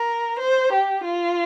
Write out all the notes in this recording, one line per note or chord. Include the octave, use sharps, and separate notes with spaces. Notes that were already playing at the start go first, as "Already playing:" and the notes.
Already playing: A#4
C5
G4
F4